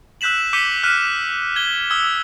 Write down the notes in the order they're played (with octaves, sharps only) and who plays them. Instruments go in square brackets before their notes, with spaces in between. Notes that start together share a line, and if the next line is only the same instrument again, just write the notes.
[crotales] E6 F#6 G6 B6 E7 F#7
D6 G6 B6 C#7 D#7 G7
F6 F#6 B6 D#7 E7
G#6 G7
D#6 E6 G#6 G7